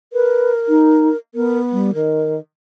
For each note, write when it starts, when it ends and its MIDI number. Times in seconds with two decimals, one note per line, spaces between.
0.13 1.17 70
0.13 0.52 71
0.68 1.09 63
1.35 1.91 59
1.35 1.59 70
1.72 1.93 55
1.94 2.40 51
1.94 2.37 70